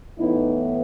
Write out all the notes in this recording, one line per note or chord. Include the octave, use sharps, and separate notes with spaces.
A2 E3 B3 D#4 E4